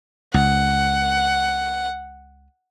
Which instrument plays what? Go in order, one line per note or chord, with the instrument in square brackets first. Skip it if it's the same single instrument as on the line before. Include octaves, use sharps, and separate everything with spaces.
[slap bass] C#2 [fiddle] F#5